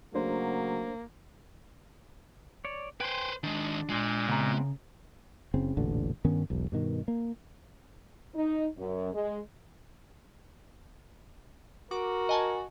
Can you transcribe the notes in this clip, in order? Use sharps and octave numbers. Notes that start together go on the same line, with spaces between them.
C#3 F#3 A3 A#3 D4 C5
C#5 D5
B4 C5 G5 G#5 C6
D#3 G#3 D4
A#2 G#3
C#3 B3 C4 A#5
F#1 C#3 C4
E1 A1 A#2 D3
G2 D#3 B3 C#4
E1 B1
G2 B2 D#3
A#3
D#4
F#2
G#3
F#4 A#4 D6
D#5 G#5 A5